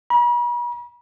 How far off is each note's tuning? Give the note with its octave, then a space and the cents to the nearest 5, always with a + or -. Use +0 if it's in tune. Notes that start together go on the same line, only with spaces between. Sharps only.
B5 -45